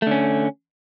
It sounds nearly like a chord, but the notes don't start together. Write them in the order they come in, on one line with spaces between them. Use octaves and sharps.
A3 D3 C#4